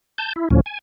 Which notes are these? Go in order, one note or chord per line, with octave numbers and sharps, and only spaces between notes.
A5 G6
E4
D2 A2 F3 C#4
G#5